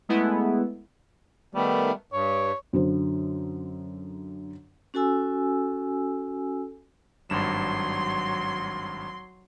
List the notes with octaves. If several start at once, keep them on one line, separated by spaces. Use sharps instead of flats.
G#3 A3 B3 E4
D#3 G3 A3 B3
G2 C#5
F#2 D3 C5
C#4 F#4 A4 G#5 E6
G#1 G2 F#3 C6 E7